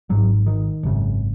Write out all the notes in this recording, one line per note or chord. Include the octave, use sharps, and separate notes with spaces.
G#1 G#2 F#3
D#3
G#1 F#2 C#3